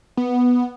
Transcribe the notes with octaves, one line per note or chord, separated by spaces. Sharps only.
B3